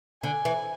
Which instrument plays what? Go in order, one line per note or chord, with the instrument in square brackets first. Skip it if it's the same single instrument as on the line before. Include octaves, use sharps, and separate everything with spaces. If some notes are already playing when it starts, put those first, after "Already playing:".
[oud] D3 [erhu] G#5
[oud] E3